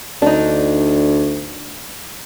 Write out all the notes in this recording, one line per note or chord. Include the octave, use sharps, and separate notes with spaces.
D2 D4 D#4